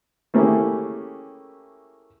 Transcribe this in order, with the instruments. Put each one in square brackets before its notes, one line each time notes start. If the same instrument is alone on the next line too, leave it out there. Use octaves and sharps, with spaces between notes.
[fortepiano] A3 A#3 C#4 E4 G4 G#4